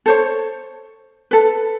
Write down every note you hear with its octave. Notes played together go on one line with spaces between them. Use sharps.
A4 C5 C#5
A4 B4